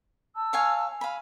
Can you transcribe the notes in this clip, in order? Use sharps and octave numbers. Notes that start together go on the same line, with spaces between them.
A5 E6
C#5 F5 G#5
F5 G#5 B5